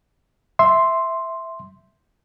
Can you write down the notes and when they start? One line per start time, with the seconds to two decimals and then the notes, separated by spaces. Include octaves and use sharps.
0.59 E5 C6